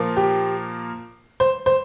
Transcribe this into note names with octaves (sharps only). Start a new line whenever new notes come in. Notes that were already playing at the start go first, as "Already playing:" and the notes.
Already playing: A#2 F3 A#3
G4
C5
C5